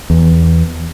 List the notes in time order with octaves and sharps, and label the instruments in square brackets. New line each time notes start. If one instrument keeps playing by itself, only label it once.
[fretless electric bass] E2